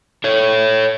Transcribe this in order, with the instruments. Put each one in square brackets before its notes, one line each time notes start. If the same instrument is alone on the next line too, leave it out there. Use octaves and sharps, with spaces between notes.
[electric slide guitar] A4 C#5